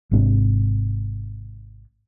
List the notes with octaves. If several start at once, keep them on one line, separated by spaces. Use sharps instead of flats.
G#1 G#2 C3 D4